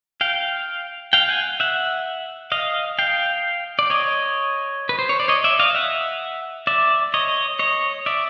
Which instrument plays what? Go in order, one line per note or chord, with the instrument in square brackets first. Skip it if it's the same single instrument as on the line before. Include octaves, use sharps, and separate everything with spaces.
[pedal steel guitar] F5 G5
F5 G5
F#5 G#5
E5 F#5
D#5 F5
F5 G5
D5
C#5 D#5
B4
C5
C#5
D5
C#5 D#5
D5 E5
D#5 F5
E5 F#5
D5 E5
C#5 D#5
C#5 D#5
D5 E5